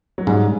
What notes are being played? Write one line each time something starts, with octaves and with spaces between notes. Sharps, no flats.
F#3
G#2 G3